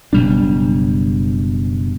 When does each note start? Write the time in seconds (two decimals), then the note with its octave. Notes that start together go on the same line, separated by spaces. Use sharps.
0.13 F#1 B2 G3 D4